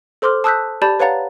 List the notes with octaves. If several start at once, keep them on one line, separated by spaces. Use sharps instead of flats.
A4 C5 C6 D6 F6
A5 D#6 E6 F#6 G6 B6
G4 D5 A5 B5 G6 A6
B4 C#5 F5 F#5 A#5 A6